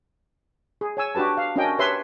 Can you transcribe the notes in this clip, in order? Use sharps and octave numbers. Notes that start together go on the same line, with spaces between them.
G#4
C#5 G#5 E6
D4 F#4 G4 B4 A5
F5
C#4 D4 F#4 A#4 D#5 G5
G4 B4 C#5 E5 C6